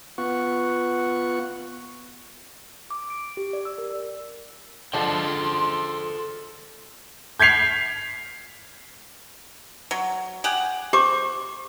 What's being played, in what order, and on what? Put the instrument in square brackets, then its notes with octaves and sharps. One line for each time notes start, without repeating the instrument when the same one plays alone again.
[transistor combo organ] B3 F4 F#5 C#6
[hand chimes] D6
D7
G4
D5
E6
A#4
[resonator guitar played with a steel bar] D3 F3 G#3 [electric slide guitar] A4 C5 G5 [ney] C6
[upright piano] G6 G#6 B6 C7 F7
[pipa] F#3
G4 G#4 F#5
[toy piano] G4 D6 [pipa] C5